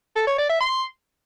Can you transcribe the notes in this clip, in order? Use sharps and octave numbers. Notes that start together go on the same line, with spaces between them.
A4
C#5
D5
E5
C6